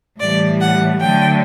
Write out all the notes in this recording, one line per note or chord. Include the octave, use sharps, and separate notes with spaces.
A2 E3 G3 D5
F#5
D3 F#3 A3 G5